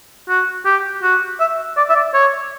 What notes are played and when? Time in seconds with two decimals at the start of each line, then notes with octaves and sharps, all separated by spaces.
0.29 F#4
0.65 G4
1.03 F#4
1.40 E5
1.77 D5
1.90 E5
1.96 D5
2.14 C#5